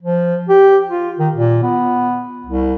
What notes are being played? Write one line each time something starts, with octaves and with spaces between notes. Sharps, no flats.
F3
G4
F4
D#3
A#2
B3
C2